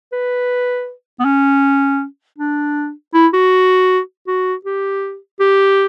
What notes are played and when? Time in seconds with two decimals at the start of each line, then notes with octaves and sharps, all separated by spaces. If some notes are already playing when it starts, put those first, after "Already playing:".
0.12 B4
1.20 B3
1.25 C#4
2.38 D4
3.14 E4
3.33 F#4
4.28 F#4
4.65 G4
5.40 G4